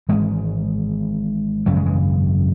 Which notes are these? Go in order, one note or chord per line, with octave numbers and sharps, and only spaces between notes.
G#1 G#2 E3 G#3
G#1 F#2 C#3 F#3 A3
E3 G#3
E3 G#3